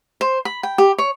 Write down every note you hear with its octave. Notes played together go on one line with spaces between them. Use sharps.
C5
B5
G5
G4
C#5